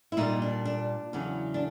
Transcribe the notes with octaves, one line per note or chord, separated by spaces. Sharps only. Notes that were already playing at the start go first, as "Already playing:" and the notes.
E4
A#2 G3 D#4
D4
D4
E2 C#3 F#3
D4